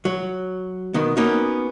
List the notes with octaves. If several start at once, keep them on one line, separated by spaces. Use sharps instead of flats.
F#3
B2 D#3 B3
A#3 B3 C#4 D#4 F#4